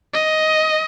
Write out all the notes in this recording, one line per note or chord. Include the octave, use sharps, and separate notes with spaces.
D#5